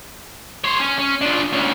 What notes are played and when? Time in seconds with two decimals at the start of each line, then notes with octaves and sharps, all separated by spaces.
0.64 C5 C#5
0.79 C#4
0.99 C#4
1.21 D4 F4
1.52 D2 C#4